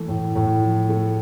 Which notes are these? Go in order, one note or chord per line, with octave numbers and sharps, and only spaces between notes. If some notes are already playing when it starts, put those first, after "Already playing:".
Already playing: E3 A3
A2
A2
F3
A3